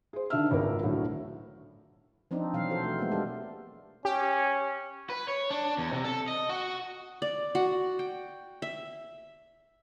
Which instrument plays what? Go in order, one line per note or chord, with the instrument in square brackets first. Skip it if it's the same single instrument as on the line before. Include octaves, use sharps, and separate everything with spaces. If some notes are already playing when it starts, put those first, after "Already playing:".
[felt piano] G#4 C5
D3 D#3 D4 E5 E6 F6
G#1 C#2 B3 A#4
A2 D3 F#3 A3
[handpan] F3 C4 D4 D#4
B2 E3 F#3 F5
F4 A4 C5
A3
G#3 A#3 B3
D4 G4 A4 A#4
[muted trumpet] C#4 [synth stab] G4
[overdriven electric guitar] B4
C#5
D4
E2
C3
A4
D#5
F#4
[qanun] D5
F#4
G5
E5